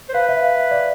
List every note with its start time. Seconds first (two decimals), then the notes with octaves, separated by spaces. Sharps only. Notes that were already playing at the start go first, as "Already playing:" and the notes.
0.09 C5
0.14 B4 F5
0.29 E5
0.43 F5
0.71 D5